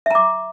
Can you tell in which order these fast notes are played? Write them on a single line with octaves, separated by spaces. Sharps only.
E5 A#5 D6